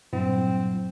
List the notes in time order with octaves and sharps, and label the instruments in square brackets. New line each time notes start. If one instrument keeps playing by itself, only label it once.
[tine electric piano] G2 A#2 E4 [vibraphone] F#3 [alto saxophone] C4